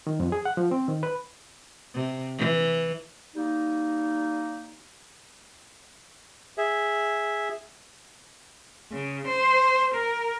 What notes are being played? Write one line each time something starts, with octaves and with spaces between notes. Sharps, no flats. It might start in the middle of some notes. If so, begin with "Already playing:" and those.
D#3
F2
G#4
F#5
F3
C4
D#3
B4
C3
E3
G3 A#3 D#4
G#4 E5
C#3
C5
A#4